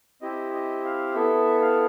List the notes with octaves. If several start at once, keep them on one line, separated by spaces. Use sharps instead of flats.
C4 E4 G4 D#5
D#5
F5
B3 E4 A4 E5
F5